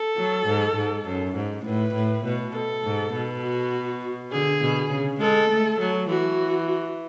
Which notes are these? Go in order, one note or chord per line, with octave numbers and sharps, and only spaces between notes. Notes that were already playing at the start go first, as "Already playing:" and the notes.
Already playing: A4
F#3
G#2
G#2
F#2
G#2
A2 B4
A2
B2
A4
G#2
B2
F#4
D3 G#4
B2
C#3
G#3 A4
A3
F#3
E3 F#4